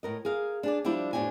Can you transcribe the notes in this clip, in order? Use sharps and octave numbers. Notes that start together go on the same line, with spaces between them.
A2 A#4 D#5
G#4 A#4 F5
D4 G#4 D5
F3 G3 D4 E4 G4
F2 A2 C#3 D4 G4 G#5